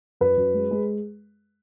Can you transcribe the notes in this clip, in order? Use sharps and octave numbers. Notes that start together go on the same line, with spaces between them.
F#2 B4
F#2
G#3
G#3